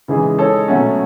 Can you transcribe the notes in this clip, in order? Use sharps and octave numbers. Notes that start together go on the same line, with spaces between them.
C#3 E3 G#3 D#4 G#4
G#3 D#4 A4 C#5
B2 F#3 A3 C#4